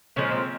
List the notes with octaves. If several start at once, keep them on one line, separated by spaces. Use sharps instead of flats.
A#2 F3 G#3 C#4
C4